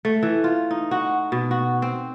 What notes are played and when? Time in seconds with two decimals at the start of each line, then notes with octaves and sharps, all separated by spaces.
0.05 A3
0.23 E3
0.44 F4
0.71 D#4
0.91 F#4
1.32 B2
1.51 F#4
1.82 C4